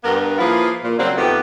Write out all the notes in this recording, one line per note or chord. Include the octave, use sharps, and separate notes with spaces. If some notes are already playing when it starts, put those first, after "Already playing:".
G2 B3 A#4
F3 A#3 E4 F4 G#4 B4
A#2
C#3 F#3 G3 A#3 C4
F2 D#3 A3 B3 G4